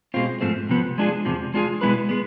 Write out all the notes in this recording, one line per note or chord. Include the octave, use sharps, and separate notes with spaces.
B2 G#3 C4 F4
G#2 F3 A3 C4
C3 F3 B3
G#3 D4 F4 G#4
E2 C3 F3
G#3 D4 F4 G#4
B2 G#3 B3 E4 B4
G#3 B3